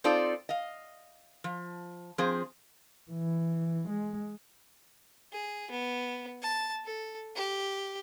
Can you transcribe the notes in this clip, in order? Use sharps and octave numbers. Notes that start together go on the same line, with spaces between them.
C4 D#4 F4 A4 C5 D5
D#5 F5
F3
F3 C4 G#4 C5
E3
G#3
G#4
B3
A5
A4
G4